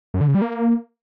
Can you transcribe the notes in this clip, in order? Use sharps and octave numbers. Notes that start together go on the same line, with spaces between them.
F#2
D3
C#3
G3
A#3